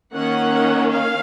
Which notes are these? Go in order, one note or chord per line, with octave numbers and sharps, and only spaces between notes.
D#3 A#3 C#4 F#5
F5